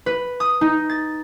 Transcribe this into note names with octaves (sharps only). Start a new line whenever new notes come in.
B4
D#6
D#4
A6